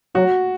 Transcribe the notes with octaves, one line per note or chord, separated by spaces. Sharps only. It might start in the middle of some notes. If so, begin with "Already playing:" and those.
F#3 F#4